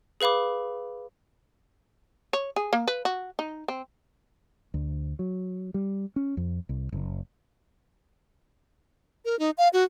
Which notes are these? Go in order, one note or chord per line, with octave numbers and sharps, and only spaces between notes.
G#4 B4 F5 B5 D6
C#5
G#4
A#3
B4
F#4
D#4
C4
D2
F#3
G3
C#4
F2
C2
F#1
A#4
D#4
F5
F#4